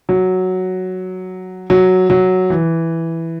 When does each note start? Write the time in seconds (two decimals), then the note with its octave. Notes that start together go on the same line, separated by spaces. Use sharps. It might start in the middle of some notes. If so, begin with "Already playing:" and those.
0.09 F#3
1.70 F#3
2.10 F#3
2.50 E3